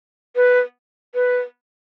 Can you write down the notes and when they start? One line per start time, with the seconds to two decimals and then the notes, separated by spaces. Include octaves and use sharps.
0.36 B4
1.15 B4